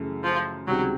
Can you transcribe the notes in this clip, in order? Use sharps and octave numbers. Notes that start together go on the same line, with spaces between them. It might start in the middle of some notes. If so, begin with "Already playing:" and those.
Already playing: F#2 C#3 E3 A3
F3
C#2 C3 D#3 F#3 G3 C4